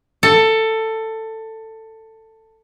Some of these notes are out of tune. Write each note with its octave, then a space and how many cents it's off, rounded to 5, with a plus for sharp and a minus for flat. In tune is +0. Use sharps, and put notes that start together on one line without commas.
A4 +15